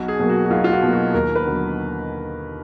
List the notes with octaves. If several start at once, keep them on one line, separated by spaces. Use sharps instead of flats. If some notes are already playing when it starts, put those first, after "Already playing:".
Already playing: B1 F#4
G#4
B2 F#3 A#3
F#4
F#4
B1 F4
F4
F#4
B2 F#3 A#3
F#4
D#2 A#4
B4
D3 F#3 B3